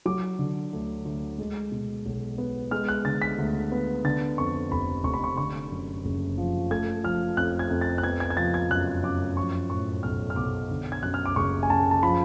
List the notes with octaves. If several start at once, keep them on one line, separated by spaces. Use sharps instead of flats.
F#3 D6
D3
D2
D2
G#3
B2
B1
B3
G#3 F6
F#6
D3 A6
B6
D2
B3
D3 A6
F2 C#6
F1 B5
F1 C#6
B5
C#6
D3 C#6
F#2
F#1
F3
A3 G#6
F3 F6
F2 F#6
G#6
F2
A6
F#6
B3 G#6
G#6
G#6
F3 A6
G#6
F#2 F#6
F#2 D6
F3 C#6
A2 C#6
B1 F6
F6
B1 D6
D3
G#6
F#2 F#6
F6
D6
F#1 C#6
G#5
F#1 A5
A5
F3 B5